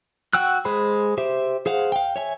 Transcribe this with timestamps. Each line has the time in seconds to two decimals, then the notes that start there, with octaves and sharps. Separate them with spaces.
0.33 F#4 F#5 G5 E6 F#6
0.65 G#3 G#4 C5 B5
1.18 G4 C5 E5
1.66 G#4 C5 F5 F#5
1.92 F5 G5
2.16 C#5 E5 G#5